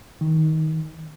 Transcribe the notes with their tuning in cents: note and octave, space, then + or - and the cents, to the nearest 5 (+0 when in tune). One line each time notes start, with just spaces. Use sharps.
D#3 +20